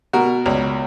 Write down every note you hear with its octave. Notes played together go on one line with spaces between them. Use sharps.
B2 F#4 A#4
C#2